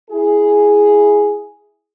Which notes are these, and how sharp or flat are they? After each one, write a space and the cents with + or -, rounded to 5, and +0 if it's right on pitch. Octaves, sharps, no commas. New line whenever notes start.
E4 +0 G#4 +0